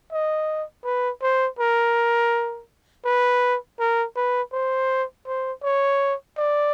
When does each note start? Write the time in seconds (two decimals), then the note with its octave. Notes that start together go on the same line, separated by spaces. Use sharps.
0.12 D#5
0.84 B4
1.22 C5
1.59 A#4
3.05 B4
3.79 A#4
4.16 B4
4.52 C5
5.26 C5
5.63 C#5
6.37 D5